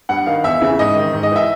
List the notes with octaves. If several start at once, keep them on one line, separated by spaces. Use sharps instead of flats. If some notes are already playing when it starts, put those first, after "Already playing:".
G2 F#5
D#3 F5
E2 E5
C#3 E3
G#2 D#5
D#3
G#2
D#5
E3 E5